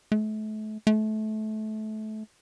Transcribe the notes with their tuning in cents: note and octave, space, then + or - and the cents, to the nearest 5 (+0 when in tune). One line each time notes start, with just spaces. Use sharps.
A3 -35
A3 -25